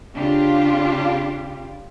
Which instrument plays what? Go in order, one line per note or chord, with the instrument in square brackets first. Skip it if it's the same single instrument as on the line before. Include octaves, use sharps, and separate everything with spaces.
[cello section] C#3 D4 F4 G4